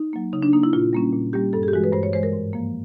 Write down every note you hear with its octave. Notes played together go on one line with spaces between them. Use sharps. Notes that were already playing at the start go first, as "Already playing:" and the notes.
Already playing: D#4
F#3 A#3
C#3 D#4
D4
F#3 A#3 D#4
E4
A#2 F4
G3 A#3 C#4
A#2
G3 A#3 C#4 G4
G2 A4
G#4
G4
E3 G#3 F#4
B4
G2 C5
C#5
E3 G#3 C5
A#4
G#2
F3 A#3